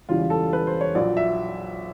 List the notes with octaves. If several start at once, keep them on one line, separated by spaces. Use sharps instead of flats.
E1 E2 C#3 E3 G3 F4
A4
B4
C5
C#5
A#1 A#2 F#3 D5
E5